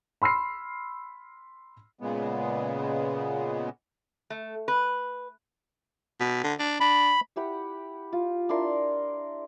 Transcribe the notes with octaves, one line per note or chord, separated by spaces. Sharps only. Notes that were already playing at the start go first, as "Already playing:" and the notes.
B5 C6 E6 F6 C7
A#2 C#3 G#3 B3
A3
B4
B2
D3
D4
D4 B5
E4 G4 F#5 B5
F4
D4 E4 A#4 C6